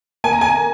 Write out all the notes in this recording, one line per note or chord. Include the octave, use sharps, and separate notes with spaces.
A#3 G#5
A#5
G#5